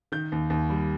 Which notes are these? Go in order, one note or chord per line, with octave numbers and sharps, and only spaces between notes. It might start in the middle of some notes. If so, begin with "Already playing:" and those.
D#3 G6
D#2
D#2
G3